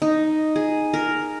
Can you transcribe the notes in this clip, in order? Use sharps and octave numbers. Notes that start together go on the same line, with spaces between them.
D#4
G#4
A#4